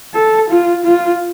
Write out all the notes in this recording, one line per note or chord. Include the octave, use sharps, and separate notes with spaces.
A4
F4
F4